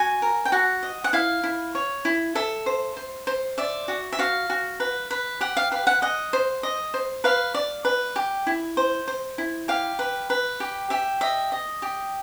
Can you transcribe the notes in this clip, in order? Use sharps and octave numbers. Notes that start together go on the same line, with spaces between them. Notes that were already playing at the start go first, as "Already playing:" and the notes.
Already playing: F#4 G#5
A#4
G5
F#4 F#5
D#5
F#5
E4 F5
E4
C#5
E4
A4 E5
C5
C5
C5
D5 E5
F#4
E5
F#4 F5
F#4
B4
B4
G4 F#5
F5
B4 F5
F#5
D#5 F#5
C5
D#5
C5
B4 F5
D5
B4
G4
E4
C5
C5
E4
G4 F5
B4
B4
G4
G4 E5
D#5 E5
D#5
G4